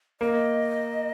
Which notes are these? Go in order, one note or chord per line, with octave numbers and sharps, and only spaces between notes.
A#3 D#5